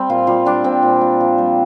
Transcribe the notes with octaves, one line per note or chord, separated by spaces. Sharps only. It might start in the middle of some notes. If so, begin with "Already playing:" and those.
Already playing: G3 C4
A#2 F4
G3 F4
G3 D4
A#2 C4
A#2
A#2
F3
G3